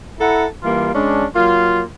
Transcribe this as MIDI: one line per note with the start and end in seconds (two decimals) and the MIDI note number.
0.20 0.46 64
0.20 0.46 69
0.20 0.46 78
0.20 0.46 82
0.63 0.93 52
0.63 0.93 55
0.63 0.93 58
0.63 0.93 65
0.94 1.26 56
0.94 1.26 61
0.94 1.26 62
1.36 1.84 54
1.36 1.84 58
1.36 1.84 65